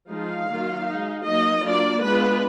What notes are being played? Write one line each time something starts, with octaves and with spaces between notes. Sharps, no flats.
F3 G#3 D#4 F5
D#3 F#3 A#3 F4
D#4
G#3
F#3 A#3 D#4 D#5
F#3 A#3 D4 F4 D5
G#3 B3 D4 F4 B4